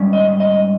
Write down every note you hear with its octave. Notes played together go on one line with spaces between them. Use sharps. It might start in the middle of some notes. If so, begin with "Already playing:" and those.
Already playing: G#2 G3 C#4
D#5
D#5